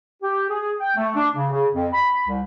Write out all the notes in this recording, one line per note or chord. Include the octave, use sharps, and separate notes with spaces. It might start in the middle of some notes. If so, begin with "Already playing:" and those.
G4
G#4
G5
A3
D4
C#3
C#3
F2
B5
C2